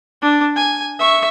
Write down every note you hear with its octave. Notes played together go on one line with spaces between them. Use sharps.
D4
G#5
E5 C#6